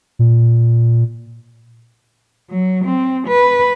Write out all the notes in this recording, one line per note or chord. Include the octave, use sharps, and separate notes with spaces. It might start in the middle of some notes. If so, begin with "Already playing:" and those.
A#2
F#3
C4
B4